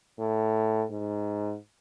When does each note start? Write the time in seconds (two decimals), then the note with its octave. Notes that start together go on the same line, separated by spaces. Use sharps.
0.19 A2
0.90 G#2